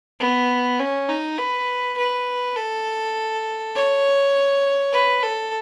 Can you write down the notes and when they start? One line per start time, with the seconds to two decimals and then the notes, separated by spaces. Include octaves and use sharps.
0.20 B3
0.79 C#4
1.09 D#4
1.38 B4
1.98 B4
2.56 A4
3.75 C#5
4.93 B4
5.23 A4